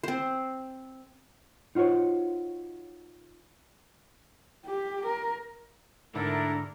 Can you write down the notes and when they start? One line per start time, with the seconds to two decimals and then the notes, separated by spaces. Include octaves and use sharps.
0.03 C4 C5
1.75 D#4 F4 F#4 C5 C#5
4.66 G4
5.06 A#4
6.15 G#2 D3 A3 D4 E4 A4 A#4